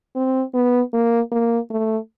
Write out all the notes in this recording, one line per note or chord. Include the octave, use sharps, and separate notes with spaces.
C4
B3
A#3
A#3
A3